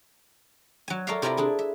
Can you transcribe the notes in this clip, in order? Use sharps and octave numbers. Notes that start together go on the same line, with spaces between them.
F#3 G#5
A4 A#4 C#5 D5 E5 F5
C3 E4 F4 A#4 D5 B5
D4 E4 G#4 A4
E5